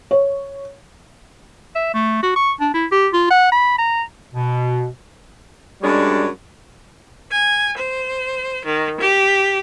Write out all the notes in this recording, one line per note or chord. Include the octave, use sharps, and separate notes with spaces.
C#5
E5
A3
F#4
C#6
D4
E4
G4
F4
F#5
B5
A#5
B2
F#2 G3 G#3 D4 C#5
G#5
C5
D#3
G4